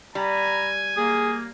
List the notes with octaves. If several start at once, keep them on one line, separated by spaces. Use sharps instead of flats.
G3 G#5 A#5 B5
A#3 G#4